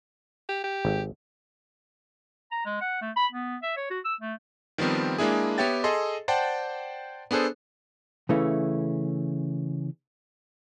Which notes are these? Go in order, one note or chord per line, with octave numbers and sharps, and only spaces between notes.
G4
G4
G#1
A#5
G#3
F#5
A3
B5
B3
E5
C#5
F#4
E6
A3
D#3 F3 G3 B3 C4
G#3 A#3 D4 E4 G#4
B3 G4 C#5 E5 G5 A6
G#4 A4 D#5 C6
C5 D5 F#5 G5 A5
B3 D4 G#4 A4 C5
C#3 E3 A3 C#4